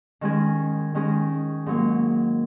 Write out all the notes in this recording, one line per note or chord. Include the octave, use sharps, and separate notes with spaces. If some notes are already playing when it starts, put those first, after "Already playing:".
D#3 G#3 C#4 G#4
D#3 G#3 C#4 G#4
G#2 F#3 A#3